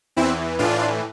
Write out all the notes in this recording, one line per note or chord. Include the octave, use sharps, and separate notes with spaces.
E2 E3 C4 E4
A2 E3 D4 F4